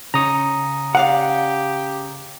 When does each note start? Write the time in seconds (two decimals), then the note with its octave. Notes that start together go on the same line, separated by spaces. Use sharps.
0.14 C#3 C#5 A#5 D#6
0.95 G4 D5 F5 F#5